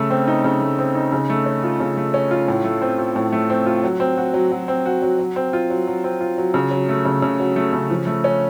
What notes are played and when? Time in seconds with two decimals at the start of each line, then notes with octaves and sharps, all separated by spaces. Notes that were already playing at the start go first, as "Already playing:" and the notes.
Already playing: C#3 A3
0.10 C4
0.27 D#4
0.44 C#3
0.61 A3
0.79 C4
0.95 D#4
1.12 C#3
1.30 A3
1.46 C#4
1.63 F4
1.80 C#3
1.97 A3
2.14 C#4
2.31 F4
2.48 A2
2.65 A3
2.82 C4
2.98 F4
3.16 A2
3.32 A3
3.50 C4
3.66 F4
3.83 F#3
4.00 C4
4.18 F#4
4.34 F#3
4.51 F#3
4.68 C4
4.86 F#4
5.02 F#3
5.19 F#3
5.36 C4
5.53 F4
5.70 F#3
5.87 F#3
6.04 C4
6.21 F4
6.38 F#3
6.54 C#3
6.71 F#3
6.89 A3
7.05 C#3
7.22 C#3
7.40 F#3
7.56 A3
7.73 C#3
7.90 F3
8.07 A3
8.24 C#4